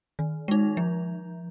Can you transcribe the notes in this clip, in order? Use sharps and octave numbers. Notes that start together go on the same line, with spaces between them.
D#3
G#3 D#4
F3